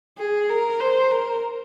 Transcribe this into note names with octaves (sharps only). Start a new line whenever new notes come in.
G#4
A#4
C5
A#4